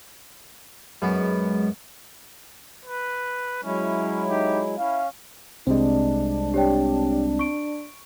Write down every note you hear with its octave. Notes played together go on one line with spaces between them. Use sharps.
F#2 G#3 B3
B4
F#3 G#3 C#4 E4
D#4 G4
C#4 E4 F5
C2 G3 G#3 C4 D4
G4 C#5 G5
C#6 D7